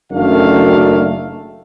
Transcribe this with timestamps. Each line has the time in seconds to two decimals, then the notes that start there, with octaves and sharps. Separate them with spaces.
0.12 F#1 F#2 D#3 A3 D4 F5